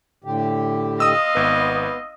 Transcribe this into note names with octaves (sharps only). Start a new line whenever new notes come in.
A2 D3 G4
D#5 F5 C6 D#6 E6
G#1 B3 B4